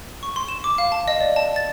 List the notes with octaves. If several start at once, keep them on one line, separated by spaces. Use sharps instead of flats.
C#6
C6
E7
D6
F5
A5
D#5
D5
A5
A6